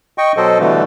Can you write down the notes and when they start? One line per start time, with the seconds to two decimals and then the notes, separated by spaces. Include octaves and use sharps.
0.18 D#5 G5 C#6
0.37 B2 F#3 A4 C5 D#5
0.59 B2 D3 E3 G3 A3